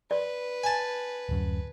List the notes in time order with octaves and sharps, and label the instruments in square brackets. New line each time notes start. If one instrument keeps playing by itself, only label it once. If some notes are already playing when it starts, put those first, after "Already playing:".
[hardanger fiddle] B4 [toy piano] D5
[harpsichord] G#5 A5
[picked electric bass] D1 F#2